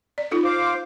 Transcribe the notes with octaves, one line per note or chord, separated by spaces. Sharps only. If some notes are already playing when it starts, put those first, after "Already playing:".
D5
D#4 F4 A4
C5 F5 D6
C6